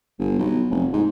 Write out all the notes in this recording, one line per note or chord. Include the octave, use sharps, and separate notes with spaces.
G1
B1
F1
G#2